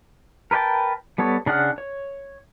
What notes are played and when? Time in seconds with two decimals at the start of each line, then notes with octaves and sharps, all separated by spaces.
0.51 A#4 B4 C#5 G5 A5
1.18 G3 B3 A4 C#5
1.46 C#3 D4 G#4 F#5 F6
1.78 C#5